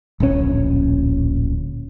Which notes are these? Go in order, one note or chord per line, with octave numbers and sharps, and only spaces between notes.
D1 A#1 B2 C#4